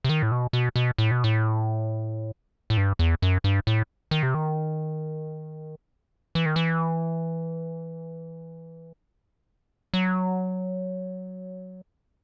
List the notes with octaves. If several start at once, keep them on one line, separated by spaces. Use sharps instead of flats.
C3
D#3
A2
B2
B2
B2
A2
B2
A2
A2
G2
E2
F#2
G2
A2
D#3
C3
D#3
E3
D#3
E3
F#3